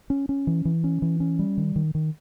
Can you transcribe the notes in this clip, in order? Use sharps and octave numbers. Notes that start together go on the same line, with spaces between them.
C#4
C#4
E3
E3
C#4
E3
C#4
G3
D#3
D#3
D#3